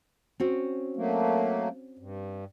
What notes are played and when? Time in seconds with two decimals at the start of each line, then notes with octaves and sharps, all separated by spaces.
0.40 C4 C#4 F#4
0.96 F#3 A3 A#3
1.99 G2